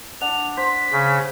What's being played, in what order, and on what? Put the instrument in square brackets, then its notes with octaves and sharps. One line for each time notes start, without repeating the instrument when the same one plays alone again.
[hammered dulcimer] D4 F#5 [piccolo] F7
[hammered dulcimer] C5 [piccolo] B6
[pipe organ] C#3